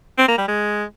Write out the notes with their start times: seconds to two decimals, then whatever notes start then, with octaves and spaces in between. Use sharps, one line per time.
0.18 C4
0.28 A#3
0.38 G3
0.48 G#3